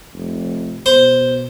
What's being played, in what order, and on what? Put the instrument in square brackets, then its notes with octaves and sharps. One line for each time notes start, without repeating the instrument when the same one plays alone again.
[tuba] F1
[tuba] B2 [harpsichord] C5